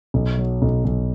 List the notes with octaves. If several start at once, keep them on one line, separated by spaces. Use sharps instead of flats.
B1
F#3
B1
B1